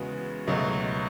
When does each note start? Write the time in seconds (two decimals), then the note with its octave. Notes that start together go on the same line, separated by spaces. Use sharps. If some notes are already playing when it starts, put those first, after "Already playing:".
Already playing: E2 C#3 G#3 B3 F#4
0.47 C#2 B2 F#3 A3